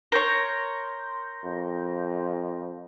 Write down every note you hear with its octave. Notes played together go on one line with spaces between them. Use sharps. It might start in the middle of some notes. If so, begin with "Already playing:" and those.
A#4 C#5 C6 G6 A#6
F2